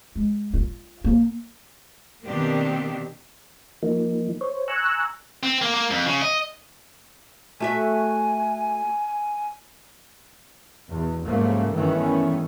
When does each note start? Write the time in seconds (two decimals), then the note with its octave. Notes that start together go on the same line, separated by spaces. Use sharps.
0.16 G#3
0.54 F4
1.04 A#3
2.26 B2 D#3 A#3 C4 D4 G4
3.83 F3 A#3 D#4
4.41 C5 C#5
4.68 G#5 A#5 C#6 E6 F#6
5.43 C4
5.62 A#3
5.74 A#3
5.91 F2
6.06 C#3
6.22 D#5
7.60 A3 F#4 E5 G#5
10.88 E2 B2
11.25 G#2 C#3 F3 F#3 A3 A#3
11.72 G2 D#3 E3 A3 B3 C#4